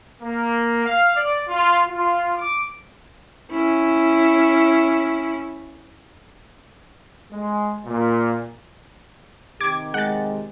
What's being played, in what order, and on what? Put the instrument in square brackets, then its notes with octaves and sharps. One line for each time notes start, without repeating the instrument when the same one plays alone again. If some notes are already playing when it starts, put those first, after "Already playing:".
[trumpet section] A#3
F5
D5
F4
F4
D6
[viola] C#4 E4
[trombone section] G#3
A#2
[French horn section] C3 D#3 G4 [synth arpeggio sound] D6 G#6
[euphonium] G#3 [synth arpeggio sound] F#5 A6